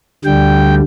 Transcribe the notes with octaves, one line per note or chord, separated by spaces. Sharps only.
D2 D3 G3 G5